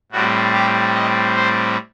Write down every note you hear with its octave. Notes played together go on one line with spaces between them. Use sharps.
A2 G3 C4 F#4
G4
D#5
C5